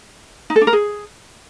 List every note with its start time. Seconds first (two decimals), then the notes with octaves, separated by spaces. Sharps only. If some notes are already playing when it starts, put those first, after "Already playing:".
0.50 D#4
0.56 A4
0.61 D4
0.67 A#4
0.73 G#4